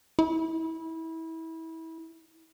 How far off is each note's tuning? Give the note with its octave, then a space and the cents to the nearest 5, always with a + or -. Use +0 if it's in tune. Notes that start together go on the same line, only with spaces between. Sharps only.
E4 -25